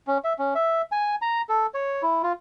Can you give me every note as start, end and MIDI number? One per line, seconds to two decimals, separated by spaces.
0.07 0.18 61
0.24 0.33 76
0.39 0.54 61
0.55 0.82 76
0.92 1.15 80
1.22 1.42 82
1.49 1.67 69
1.74 2.02 73
2.03 2.22 64
2.23 2.33 65